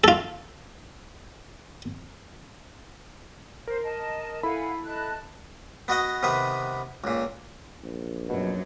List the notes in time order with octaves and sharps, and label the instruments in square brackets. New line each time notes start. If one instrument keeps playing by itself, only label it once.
[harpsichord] F4 A4
[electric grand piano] A#4 [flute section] C5
[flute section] D#5 A5
[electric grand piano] E4 A4 B5 [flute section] F5 F#5 G#5
[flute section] D#5 A5 F#6
[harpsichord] B3 F#4 D#5 F#5
C3 D#3 B3 B4
C#2 A#2
[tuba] A#1
[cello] F#2 F#3 [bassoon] B2